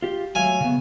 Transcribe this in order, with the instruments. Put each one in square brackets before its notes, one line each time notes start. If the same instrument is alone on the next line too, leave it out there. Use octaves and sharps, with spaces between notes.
[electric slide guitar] F4 G4
[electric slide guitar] F#3 A3 F5 [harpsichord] G#5
[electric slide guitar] C#3 B3